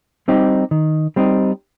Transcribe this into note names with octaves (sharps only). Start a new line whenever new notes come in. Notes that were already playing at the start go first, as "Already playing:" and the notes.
G3 C4 D#4 G4
D#3
G3 C4 D#4